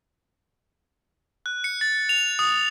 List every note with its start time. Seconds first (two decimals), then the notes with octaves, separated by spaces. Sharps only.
1.46 F#6
1.64 C#7
1.81 A6
2.09 F7
2.39 D#6